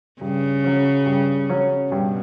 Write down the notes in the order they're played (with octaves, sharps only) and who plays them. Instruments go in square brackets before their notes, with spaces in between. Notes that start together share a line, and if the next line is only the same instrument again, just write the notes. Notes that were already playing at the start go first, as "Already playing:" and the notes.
[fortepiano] G2 [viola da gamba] C#3
[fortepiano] F#3 C#4
G2
F#3 C#4
[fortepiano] G2 [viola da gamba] B2